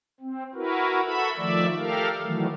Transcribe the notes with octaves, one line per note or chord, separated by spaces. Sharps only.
C4
E4 F#4 A#4 B4
F#4 A4 E5 B5
D#3 F3 A3 D5 E5
G4 A4 A#4 F5
D#3 E3 F#3 A3